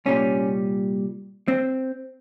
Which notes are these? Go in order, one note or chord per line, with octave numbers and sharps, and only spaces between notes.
C2 A#2 G3 C#4
C4